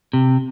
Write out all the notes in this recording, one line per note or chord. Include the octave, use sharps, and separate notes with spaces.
C3